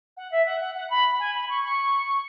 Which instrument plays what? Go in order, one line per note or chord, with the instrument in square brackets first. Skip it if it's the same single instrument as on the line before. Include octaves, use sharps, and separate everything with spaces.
[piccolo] F#5
E5
F#5
F#5
F#5
B5
G#5
B5
C#6
C#6